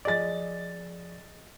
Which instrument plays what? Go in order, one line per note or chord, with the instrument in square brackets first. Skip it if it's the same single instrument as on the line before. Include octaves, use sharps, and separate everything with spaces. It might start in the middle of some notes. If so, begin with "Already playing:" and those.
[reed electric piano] F3 G#4 D5 [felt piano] D#5 A6